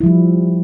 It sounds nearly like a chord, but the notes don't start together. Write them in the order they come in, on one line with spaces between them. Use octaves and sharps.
E4 F3 G3